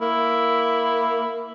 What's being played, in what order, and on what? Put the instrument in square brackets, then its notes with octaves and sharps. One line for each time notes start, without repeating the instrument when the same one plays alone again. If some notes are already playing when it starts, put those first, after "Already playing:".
[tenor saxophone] A#3 [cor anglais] E4